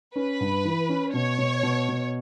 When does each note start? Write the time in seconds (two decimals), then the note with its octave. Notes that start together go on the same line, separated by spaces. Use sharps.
0.16 C#4 B4
0.41 G2
0.65 E3
0.89 C#4
1.14 B2 C#5
1.38 B2
1.63 B2
1.88 B2